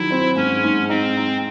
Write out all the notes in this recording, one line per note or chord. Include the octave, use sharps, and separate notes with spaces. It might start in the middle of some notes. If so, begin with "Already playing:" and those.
Already playing: D#3 F#3 E4
C4
G#2 C#4
G#2
C4 D#4
D#4